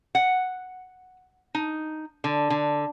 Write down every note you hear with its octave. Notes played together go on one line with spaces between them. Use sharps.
F#5
D#4
D3
D3